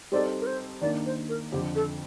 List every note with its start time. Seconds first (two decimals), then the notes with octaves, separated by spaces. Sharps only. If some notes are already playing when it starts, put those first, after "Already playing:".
0.12 G3 C4 D#4 A4 D5
0.41 A#4
0.46 C5
0.81 D#3 A#3 D4 D5
1.06 C5
1.29 A#4
1.52 F2 D3 F3 G4
1.75 A4